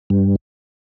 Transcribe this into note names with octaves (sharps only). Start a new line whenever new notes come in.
G2